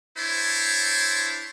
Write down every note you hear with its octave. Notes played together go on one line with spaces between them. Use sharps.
D4 E4 C5 C#5